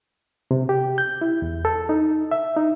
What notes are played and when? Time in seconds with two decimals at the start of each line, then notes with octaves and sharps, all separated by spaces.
0.51 C3
0.69 G4
0.98 G6
1.21 E4
1.42 E2
1.65 A4
1.89 D#4
2.31 E5
2.57 D#4